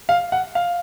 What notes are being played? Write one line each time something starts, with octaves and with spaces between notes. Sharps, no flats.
F5
F#5
F5